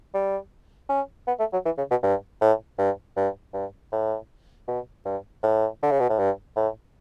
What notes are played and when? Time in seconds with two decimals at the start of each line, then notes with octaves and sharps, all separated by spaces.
0.14 G3
0.89 C#4
1.27 B3
1.39 A3
1.53 F#3
1.65 E3
1.78 C#3
1.90 B2
2.03 G2
2.41 A2
2.78 G2
3.17 G2
3.53 G2
3.92 A2
4.68 B2
5.05 G2
5.43 A2
5.83 D3
5.91 C#3
6.00 B2
6.09 A2
6.19 G2
6.56 A2